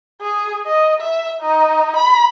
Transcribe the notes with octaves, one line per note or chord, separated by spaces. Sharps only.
G#4
D#5
E5
D#4
B5